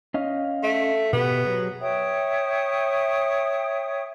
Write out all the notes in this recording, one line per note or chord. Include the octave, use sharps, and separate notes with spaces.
C#4 D#5 F5
A3
B2 B3 G4
F#3 G#4
C#5 E5 G5 D#6